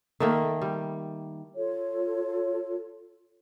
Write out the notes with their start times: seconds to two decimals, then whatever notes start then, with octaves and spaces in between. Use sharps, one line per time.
0.20 D#3 A3 A#3
0.62 G3
1.56 F4 A4 C#5